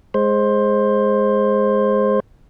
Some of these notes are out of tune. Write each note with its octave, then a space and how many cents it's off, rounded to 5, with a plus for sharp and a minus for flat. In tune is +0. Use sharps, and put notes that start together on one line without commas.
G#3 +0 C5 +15